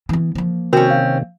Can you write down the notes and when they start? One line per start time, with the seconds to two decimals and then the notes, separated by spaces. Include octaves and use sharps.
0.09 E3 B3
0.35 F3 A#3
0.73 C3 D#3 C4 C#4 F#4
0.90 F5